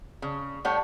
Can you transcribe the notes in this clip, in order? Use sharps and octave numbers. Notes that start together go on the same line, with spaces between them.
C#3
A2 G3 A3 C#5 F#5